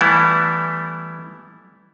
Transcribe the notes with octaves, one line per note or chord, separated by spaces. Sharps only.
E3 G3 A3 B3 E4